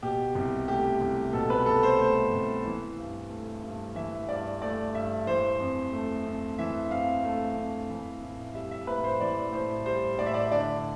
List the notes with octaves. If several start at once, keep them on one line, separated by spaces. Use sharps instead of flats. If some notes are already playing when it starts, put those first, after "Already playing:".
B2 G4
C2
A3 G4
C2
B2 A4
B4
C2 A4
C5
A3 C5
C2
E3
G2
A3
G2
E3 E5
G2 D5
A3 D5
G2 E5
E3 C5
F2
A3
F2
E3 E5
F2 F5
A3
F2
E3
A2
G3 E5
E5
A2 B4
C5
E3 D5
A2 C5
G3 C5
A2 D5
E5
D5
D3 D5